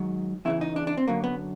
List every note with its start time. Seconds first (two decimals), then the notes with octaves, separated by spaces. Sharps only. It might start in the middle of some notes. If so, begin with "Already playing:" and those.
Already playing: G#2 D#3 F#3
0.45 E2 C#3 E3 E4
0.61 D#4
0.76 D4
0.87 D4
0.97 C4
1.08 F#2 D3 F#3 A#3
1.24 B3